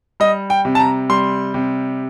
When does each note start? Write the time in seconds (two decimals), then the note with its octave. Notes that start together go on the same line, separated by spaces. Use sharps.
0.20 G3 D#5
0.50 G5
0.65 C3
0.75 A5
0.80 A#5
1.10 G3 C6
1.54 C3